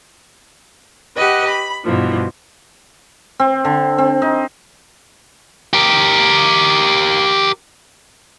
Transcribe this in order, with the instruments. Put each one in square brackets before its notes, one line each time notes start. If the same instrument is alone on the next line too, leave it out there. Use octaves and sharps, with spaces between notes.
[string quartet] G4 B4 D#5 F#5
B5
G2 B2 E3 F3
[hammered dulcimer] C4
D3
C4
D#4
[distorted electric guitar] G4 A#4